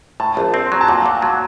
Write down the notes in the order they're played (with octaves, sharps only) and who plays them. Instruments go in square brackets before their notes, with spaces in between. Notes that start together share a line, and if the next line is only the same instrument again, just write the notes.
[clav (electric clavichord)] A2 [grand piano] A5
[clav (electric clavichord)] A#1
C4
[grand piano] C6
[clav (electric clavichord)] F#3 [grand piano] A#5
[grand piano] A5
[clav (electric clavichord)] A#2 [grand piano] F#5
[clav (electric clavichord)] A#2 [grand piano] F#5
[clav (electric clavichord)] F#3 [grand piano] A5